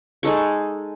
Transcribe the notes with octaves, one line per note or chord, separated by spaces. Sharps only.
G#3 D#4 A4 C#6